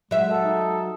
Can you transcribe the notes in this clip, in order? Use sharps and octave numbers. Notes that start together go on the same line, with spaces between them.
F#3 G#3 E5
A4
D#4